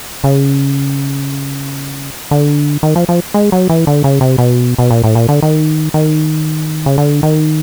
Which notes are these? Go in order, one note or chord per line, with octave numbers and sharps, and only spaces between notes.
C#3
D3
D#3
F3
F3
G#3
F#3
E3
D3
C#3
C3
B2
B2
A#2
A2
A#2
D3
D#3
D#3
C#3
D3
D#3